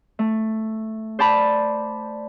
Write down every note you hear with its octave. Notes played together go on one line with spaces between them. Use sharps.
A3
C5 D5 A5 B5